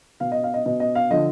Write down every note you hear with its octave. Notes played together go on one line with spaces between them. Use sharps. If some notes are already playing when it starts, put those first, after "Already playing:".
B2 F5
D#5
F5
D#5
B2 D#5
D#5
F5
D3 F3 D#5